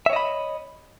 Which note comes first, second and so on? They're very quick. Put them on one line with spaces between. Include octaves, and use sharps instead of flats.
E5 C#5 D#5 B5